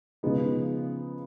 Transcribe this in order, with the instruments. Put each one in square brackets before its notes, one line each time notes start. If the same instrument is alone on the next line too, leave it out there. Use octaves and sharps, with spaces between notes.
[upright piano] C#3 F3 G#3 B3 D#4